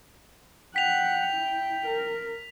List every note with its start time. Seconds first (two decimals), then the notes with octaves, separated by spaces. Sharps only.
0.76 F#5 G5 B6 F7
1.33 E4
1.87 A#4